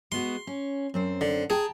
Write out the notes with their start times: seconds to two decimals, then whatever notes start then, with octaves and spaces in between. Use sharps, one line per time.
0.12 G#3 B3 F#4 C6
0.47 C#4
0.94 F#2 C4 C5
1.21 D3
1.50 G#4 G5 A5 A#5